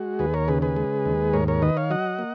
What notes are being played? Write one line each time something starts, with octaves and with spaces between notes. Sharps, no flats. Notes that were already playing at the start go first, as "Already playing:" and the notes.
Already playing: G#3 F#4
D#2 G#4 B4
A#4 C#5
C#3 G#4 B4
G#4 B4
G#3
D#2
G#2 A#4 C#5
A#4 C#5
D#3 B4 D#5
C#5 F5
F#3 D#5 F#5
A#3